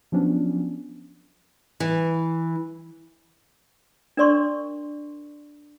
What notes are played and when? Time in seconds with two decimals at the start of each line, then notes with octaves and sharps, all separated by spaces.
0.12 F3 F#3 B3 C#4 D4
1.80 E3
4.17 D4 A#4 D5 C6 C#6